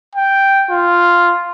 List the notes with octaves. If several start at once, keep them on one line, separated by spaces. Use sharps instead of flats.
G5
F4